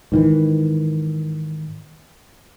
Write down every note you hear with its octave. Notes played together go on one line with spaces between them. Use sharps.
G#2 D#3 E3